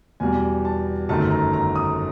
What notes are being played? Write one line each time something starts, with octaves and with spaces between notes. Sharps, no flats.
E2 B2 G3 G#5
A5
G1 F#2 D#3 F#3 A3 A5
A#5
A#5
D#6